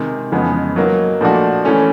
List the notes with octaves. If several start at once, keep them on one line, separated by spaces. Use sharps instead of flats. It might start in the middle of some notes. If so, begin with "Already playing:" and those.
Already playing: C3 D#3 G#3
F2 C#3 E3 G#3 B3
F#3 A#3 D#4
A#2 F3 A3 D4 F#4
E3 A3 C#4